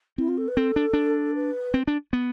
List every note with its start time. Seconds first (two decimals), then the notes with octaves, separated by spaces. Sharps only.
0.18 C4 E4
0.28 F4
0.37 A4
0.48 B4
0.57 C4 A4
0.76 D4
0.93 D4
1.35 B4
1.74 C4
1.87 D4
2.13 B3